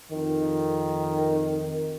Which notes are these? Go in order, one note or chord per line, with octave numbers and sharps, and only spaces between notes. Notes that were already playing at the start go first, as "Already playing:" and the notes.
F2 D#3